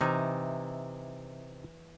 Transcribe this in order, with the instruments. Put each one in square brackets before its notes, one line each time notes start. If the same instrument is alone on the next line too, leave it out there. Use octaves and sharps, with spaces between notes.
[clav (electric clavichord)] C3 D#4 [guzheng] E3